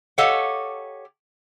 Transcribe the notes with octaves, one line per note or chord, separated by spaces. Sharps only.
G4 A4 C#5 D#5 F5 F#5